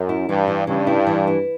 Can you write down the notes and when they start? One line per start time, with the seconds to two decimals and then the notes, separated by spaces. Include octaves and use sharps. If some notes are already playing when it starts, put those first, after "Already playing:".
Already playing: F#2
0.09 E4
0.28 G2 E3
0.48 E3
0.67 G2 C#3
0.87 E4
1.07 E3
1.27 E4